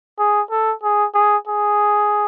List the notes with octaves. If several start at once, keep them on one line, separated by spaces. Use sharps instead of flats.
G#4
A4
G#4
G#4
G#4